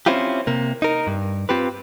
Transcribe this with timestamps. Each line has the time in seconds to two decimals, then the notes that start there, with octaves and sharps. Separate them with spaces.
0.06 C4 C#4 E4 F4 G4
0.47 C3 A#3
0.82 D#4 A#4
1.07 G2
1.49 C4 F4 G4 B4